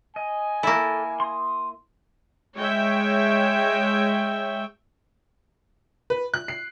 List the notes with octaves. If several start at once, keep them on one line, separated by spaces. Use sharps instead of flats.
D#5 G#5
A#3 E4 A4
C6 D#6
G#3 C#5 E5 G5
B4
F#6
C7